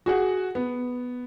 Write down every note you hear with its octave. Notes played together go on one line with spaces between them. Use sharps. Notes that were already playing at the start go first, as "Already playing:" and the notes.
F#4 G#4 F#5
B3